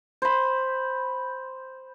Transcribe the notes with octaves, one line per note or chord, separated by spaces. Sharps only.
C5 B5